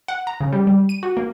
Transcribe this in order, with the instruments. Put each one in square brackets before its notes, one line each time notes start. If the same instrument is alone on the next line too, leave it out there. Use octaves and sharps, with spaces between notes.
[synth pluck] F#5
A#5
C#3
G3
G3
D#7
F#4
A#3